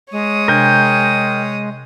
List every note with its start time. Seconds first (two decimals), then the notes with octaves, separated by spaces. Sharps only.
0.12 G#3 C#5 D#6
0.48 C3 D4 A#4 G5 G#5